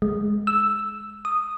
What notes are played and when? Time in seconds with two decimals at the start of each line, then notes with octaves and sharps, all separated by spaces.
0.02 G#3
0.47 E6
1.25 D#6